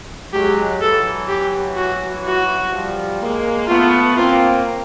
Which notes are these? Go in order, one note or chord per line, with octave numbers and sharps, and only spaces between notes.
F#3 G#3 G4
E3 F#3 A4
G4
F#4
F#4
F3 G3
G#3 A#3
A3 B3 F4
A#3 C4 F4